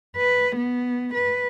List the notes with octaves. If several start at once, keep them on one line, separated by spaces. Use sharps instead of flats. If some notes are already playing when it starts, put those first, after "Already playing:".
B4
B3
B4